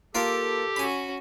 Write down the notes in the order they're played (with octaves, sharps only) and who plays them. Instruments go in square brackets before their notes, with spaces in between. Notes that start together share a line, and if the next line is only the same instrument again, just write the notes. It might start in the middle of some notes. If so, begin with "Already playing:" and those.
[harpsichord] A#3 F4 A#4 [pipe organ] G4 [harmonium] A4
[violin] C#4 F#4 [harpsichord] G#5 B5